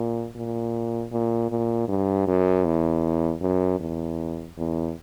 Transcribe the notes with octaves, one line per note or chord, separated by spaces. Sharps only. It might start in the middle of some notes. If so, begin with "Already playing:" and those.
Already playing: A#2
A#2
A#2
A#2
G2
F#2
E2
F#2
E2
E2